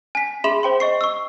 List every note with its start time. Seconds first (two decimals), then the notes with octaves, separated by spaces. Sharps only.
0.15 G#5 B6
0.44 G#4 E5 B5 C6 E7
0.63 C5 G5 C6
0.80 D#5 C#6 C7
1.01 C#6 E6